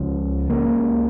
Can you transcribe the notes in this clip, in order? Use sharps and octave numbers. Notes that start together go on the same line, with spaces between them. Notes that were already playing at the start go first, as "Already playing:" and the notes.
Already playing: C#2 C#3 F3
C#2 C#3 A#3